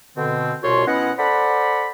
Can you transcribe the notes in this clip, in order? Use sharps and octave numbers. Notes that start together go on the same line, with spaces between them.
B2 D3 C4
C2 B2 F4 F#4 C#5 C6
B3 C#4 E4 D#5 F#5
A4 C5 D5 F#5 B5